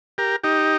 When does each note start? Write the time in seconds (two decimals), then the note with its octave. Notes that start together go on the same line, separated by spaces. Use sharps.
0.18 G4 A#4
0.43 D#4 G4